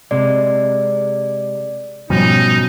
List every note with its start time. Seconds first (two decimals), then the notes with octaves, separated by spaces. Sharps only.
0.11 C3 G#3 D5
2.10 G#2 B2 F3 G3 C#4 D#4